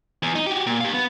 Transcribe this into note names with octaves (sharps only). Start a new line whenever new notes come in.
E2
D#4
F#4 G4
A#2
G4 F5
B3